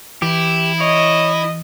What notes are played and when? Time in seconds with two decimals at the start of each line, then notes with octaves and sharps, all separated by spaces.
0.22 E3 E4 G4
0.80 C#5 D#5